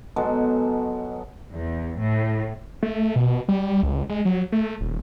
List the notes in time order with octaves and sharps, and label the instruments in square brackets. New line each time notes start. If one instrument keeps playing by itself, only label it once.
[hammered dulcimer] B2 F#3 G#3 A4
[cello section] E2
A2
[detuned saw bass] A3
B2
G3
C#2
G#3
F#3
A3
D#1